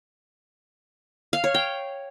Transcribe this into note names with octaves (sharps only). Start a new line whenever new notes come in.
F5
C#5
G5